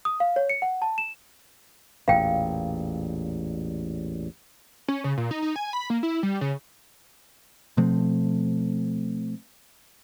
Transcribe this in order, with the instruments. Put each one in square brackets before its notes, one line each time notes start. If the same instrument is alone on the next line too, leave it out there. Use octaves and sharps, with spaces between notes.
[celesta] D#6
F5
C#5
C#7
F#5
A5
E7
[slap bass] A1 E2 A#2 [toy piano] F5 G5
[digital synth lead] C#4
C#3
A#2
D#4
D#4
G#5
B5
A#3
E4
G3
C#3
[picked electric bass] B2 F3 A3 C4